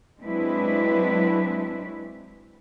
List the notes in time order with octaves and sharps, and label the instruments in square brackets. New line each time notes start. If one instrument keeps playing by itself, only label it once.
[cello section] F#3 G#3 C4 D4 E4 B4